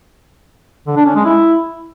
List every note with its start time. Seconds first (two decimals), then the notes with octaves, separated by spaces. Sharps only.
0.87 D3
0.96 D4
1.06 C#4
1.15 G#3
1.25 E4